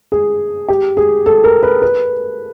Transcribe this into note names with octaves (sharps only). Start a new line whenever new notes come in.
G#4
G4
G#4
A4
A#4
B4
B4